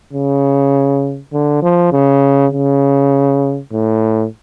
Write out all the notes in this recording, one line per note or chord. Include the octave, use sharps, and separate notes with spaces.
C#3
D3
F3
C#3
C#3
A2